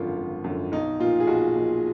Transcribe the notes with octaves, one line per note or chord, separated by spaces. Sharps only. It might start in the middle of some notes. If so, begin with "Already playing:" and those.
Already playing: G#1 F#2 D3 F3 F4
G#1
F#2 D3 F3
B1 D#4
A#2 F3 F4
G#4
B1 F#4
A#2 F3